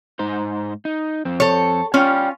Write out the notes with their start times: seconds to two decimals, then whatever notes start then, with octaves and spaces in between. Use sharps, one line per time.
0.19 G#2 D#4 C5
0.85 D#4
1.25 F2 C4
1.40 A4 C#5
1.94 C#4 F4 C#5 D5 G5